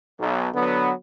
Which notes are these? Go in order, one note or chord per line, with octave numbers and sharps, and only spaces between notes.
B1
D3 F#3 B3